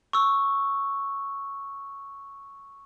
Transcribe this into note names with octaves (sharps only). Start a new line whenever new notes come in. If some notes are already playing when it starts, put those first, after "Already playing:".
C#6 E6